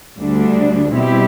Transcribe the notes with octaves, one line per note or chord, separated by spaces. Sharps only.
D2 D3 G3 D4
B2 G3 C4 E4 G4